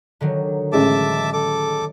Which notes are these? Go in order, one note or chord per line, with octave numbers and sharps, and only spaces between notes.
D3 D#3 F#3
A1 G#3 E5 A5 D6
A4 D6